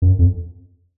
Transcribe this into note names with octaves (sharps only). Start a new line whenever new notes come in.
F#2
F2